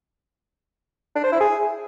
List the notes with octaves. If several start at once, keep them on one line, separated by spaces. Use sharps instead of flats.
D4
C5
E4
G#4